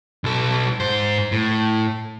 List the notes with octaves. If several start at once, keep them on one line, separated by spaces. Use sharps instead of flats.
B1 A4
G#2 C5
A2